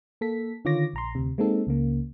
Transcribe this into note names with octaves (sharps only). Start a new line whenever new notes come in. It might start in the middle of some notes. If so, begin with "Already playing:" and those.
A#3 A4 B6
D3 D#3 F4 C#5 D6 A#6
A#1 A#5 C6
D2 C3
G#3 A#3 C4 D#4 A4
C#2 C#3 A#3